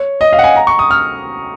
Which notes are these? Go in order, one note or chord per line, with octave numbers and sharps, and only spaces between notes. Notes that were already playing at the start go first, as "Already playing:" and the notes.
Already playing: C#5
D#5
F5
F#5
G#5
A#5
C#6
D#6
F6